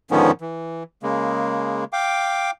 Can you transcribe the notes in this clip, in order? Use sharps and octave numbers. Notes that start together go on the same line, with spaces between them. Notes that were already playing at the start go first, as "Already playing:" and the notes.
G#2 D3 D#3 F3 B3 C#4
E3
C#3 G#3 A#3
F5 G5 D6